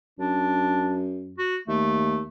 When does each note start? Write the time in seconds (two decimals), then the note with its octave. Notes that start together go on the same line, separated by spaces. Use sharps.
0.19 F#2 D4
1.38 F#4
1.68 D#2 A3